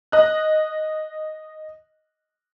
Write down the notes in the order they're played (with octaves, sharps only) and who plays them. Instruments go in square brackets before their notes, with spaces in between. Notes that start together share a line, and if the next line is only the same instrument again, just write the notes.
[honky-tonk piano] D#5 F#6